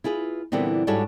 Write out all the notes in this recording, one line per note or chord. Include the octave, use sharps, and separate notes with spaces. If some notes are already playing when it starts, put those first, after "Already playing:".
E4 F4 G#4 B4
A#2 D3 E3 G3 B3 C4
G#2 G3 D4 F#4 A4 C#5